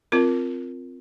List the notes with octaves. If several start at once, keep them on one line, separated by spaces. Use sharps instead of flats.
C4 F4 A#4